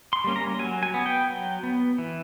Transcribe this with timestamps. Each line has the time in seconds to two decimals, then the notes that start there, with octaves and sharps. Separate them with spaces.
0.13 C6
0.24 G3 A#3 C#4
0.36 A#5
0.59 F#3 G#5
0.83 G#5
0.94 B3
1.06 G5
1.29 F#3
1.63 B3
1.98 E3